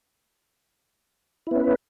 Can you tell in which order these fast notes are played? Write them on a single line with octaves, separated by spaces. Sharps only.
E4 B3 C#4 B4